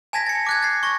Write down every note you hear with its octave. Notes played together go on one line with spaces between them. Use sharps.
G#5 A5 G#6 A#6 B6
A6 C#7
D6 F#6 G#6
A6 C7
C#6 A#6